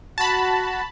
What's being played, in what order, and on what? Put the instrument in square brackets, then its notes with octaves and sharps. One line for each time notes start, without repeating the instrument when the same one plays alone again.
[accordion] F#4 [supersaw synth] A5 B5